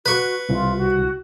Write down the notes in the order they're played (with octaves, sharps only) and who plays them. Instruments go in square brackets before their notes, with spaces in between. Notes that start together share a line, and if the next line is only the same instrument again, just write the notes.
[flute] F#4 [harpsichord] B4 C#6
[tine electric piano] C2 [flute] F4
[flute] F#4